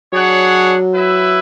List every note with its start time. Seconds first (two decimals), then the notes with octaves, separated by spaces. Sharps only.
0.13 F#3 D4 G#4 C#5 F#5
0.92 E4 B4 E5